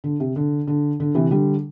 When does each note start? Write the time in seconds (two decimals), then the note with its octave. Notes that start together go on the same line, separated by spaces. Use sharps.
0.04 D3
0.20 C3
0.36 D3
0.67 D3
1.00 D3
1.15 C3 E3
1.31 D3 G3